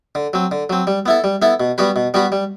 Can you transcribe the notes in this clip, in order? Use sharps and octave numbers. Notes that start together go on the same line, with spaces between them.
D3
F#3 C4
D3
F#3 C4
G3
B3 E4 A4
G3
B3 E4 A4
B2
G3 B3 F#4 B4
B2
G3 B3 F#4 B4
G3